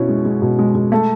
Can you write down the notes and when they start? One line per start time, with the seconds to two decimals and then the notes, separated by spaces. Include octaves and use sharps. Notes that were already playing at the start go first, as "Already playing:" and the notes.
Already playing: B2 C#4 E4
0.09 G#3
0.25 G#3
0.42 B2
0.59 G#3
0.75 G#3
0.92 A3